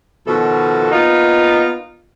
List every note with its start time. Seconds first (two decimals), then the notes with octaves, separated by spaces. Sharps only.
0.27 B2 D#3 F3 F#4 A4
0.92 A#3 B3 D#4 F4